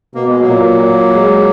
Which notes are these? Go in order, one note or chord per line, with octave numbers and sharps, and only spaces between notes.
B2 A#3
G#3
F#3 A#3
A#2
A#2
G#3